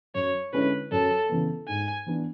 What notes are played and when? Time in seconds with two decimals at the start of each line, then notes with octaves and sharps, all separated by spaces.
0.15 F#2 C#5
0.53 D3 G#3 C#4 E4 B4
0.92 F#2 A4
1.29 C#3 E3 B3
1.68 G#2 G#5
2.06 E3 B3 D4